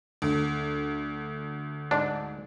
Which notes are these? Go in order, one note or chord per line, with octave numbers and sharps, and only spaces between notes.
D2
G#2 D4